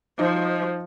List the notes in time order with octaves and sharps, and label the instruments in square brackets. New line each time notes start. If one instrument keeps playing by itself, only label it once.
[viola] F3 [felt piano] D#4 D#5 [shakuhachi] C5